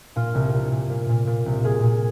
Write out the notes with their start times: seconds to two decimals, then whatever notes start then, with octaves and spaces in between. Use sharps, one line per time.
0.16 A#2 F4
0.34 C2
0.53 C2
0.72 A#2
0.90 A#2
1.09 A#2
1.27 A#2
1.46 C2
1.64 A#2 G#4
1.83 A#2